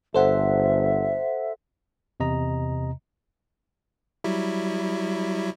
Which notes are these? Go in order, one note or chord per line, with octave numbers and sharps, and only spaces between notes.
G1 A4 C5 E5 F#5
E2 C3 D#5 A#5
F#3 G3 E4